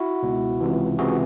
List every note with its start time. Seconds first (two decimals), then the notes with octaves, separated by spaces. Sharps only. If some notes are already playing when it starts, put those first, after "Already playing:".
Already playing: E4 F#4
0.23 C#2 B2
0.60 C#2 C3 E3
0.98 C#2 C3 E3 F#4 G#4